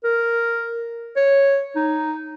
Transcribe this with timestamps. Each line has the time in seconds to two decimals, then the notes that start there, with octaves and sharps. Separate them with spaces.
0.04 A#4
1.16 C#5
1.76 D#4